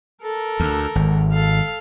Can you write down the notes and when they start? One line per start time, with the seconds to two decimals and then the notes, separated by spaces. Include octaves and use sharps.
0.23 A4 A#4
0.60 D2
0.95 G#1
1.33 A4 F5